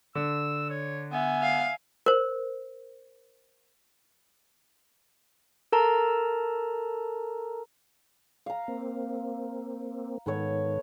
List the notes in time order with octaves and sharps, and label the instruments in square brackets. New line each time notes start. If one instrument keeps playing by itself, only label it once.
[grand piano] D3 [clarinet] E6
[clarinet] C#5
[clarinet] B3 [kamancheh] E5 G#5
[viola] F5
[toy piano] A#4 C5
[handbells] A4 A#4 A5 A#5
[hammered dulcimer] F5 A#5
[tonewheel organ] A#3 C4
[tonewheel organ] G#2 D#3 [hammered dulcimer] B3 A4 C#5